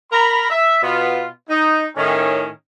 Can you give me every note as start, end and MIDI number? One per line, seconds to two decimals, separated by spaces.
0.12 0.50 70
0.12 0.50 82
0.12 0.50 83
0.50 0.80 76
0.82 1.28 47
0.82 1.28 59
0.82 1.28 65
1.49 1.86 63
1.96 2.48 45
1.96 2.48 51
1.96 2.48 61